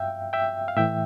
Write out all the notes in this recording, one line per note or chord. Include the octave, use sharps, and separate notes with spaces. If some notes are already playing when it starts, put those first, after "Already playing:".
Already playing: G2 E5 F5 G5
E5 G5
F5
A2 E3 E5 G5